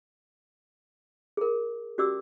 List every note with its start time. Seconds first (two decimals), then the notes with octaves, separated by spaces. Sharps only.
1.37 G#4 A#4
1.98 C#4 F#4 G4 D5 D6 E6